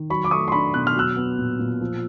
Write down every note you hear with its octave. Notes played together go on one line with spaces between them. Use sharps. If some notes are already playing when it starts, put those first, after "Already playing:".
Already playing: D#3
F#3 B5 C#6
D6
A3 C#6 D#6
C6
D4 B5 C#6
B2 F#6
F6
F#3 E6 F#6
B3
A#2
A#2
F3